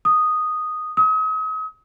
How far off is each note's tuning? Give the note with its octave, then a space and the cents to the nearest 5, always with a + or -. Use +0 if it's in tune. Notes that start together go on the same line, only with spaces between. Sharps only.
D#6 -5
D#6 +40